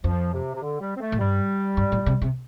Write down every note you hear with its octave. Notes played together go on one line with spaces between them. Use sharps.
F2 F3
C3
C3
D3
G3
C4
A3
A2
G2 G3
G2
A2
C3
C3